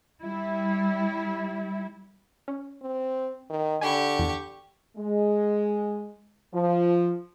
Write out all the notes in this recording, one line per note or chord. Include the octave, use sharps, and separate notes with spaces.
G3 E4
C#4
C4
D#3
D3 G4 G#5 B5 C#6
E2
G#3
F3